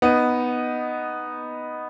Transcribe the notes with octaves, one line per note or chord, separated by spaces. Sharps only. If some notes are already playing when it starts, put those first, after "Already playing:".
B3 D#4